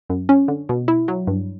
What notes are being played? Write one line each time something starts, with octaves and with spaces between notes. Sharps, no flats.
F#2
C#4
D3
B2
E4
F#3
G2